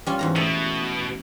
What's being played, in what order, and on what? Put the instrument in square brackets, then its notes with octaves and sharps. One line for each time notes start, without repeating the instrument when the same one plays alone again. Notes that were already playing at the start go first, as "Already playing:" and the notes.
[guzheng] G3 C#4 F4
E2 G#2 A#5
[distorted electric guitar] B2 [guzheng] A3